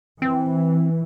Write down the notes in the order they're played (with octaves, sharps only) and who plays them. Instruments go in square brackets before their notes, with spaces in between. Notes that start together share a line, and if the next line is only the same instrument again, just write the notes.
[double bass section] E3 [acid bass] C4